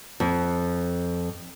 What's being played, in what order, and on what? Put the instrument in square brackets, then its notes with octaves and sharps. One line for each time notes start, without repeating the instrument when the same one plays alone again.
[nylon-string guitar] F2